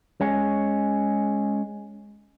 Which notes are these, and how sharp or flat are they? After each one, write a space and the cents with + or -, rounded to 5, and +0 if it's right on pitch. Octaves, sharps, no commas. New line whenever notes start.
G#3 +0 C#4 +0